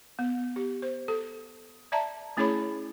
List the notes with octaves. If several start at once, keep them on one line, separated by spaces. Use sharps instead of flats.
B3
G4
C5
A4
D5 E5 A5 A#5
A3 C#4 E4 G#4 C#5 B5